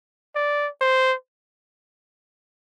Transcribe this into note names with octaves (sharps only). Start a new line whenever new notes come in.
D5
C5